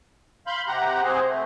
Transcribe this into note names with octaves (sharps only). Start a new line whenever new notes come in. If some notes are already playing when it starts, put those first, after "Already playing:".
F5 B5 C6 G6
C3 G4 F#5 A#5
C4 G#4 C5
A3